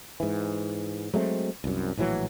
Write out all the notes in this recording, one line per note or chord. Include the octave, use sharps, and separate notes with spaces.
G#2 E3
F#3 G#3 A3 C4
C2 F#2
A#1 A2 E3 F#3